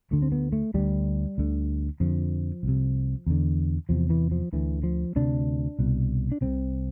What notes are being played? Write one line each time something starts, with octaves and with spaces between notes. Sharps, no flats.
D2 D3 A3
C4
B3
A3
D2 D3 G3
D2 D3
F2 D3 F3
C2
C3
E2 D3
E2 C3 F3
E3
F3
D2 D3 E3
F3
D2 C3 D4
C2 B2
D4
C2 C3 C4